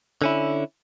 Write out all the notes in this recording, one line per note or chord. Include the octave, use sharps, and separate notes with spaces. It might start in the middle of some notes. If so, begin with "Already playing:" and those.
D3 C#4 E4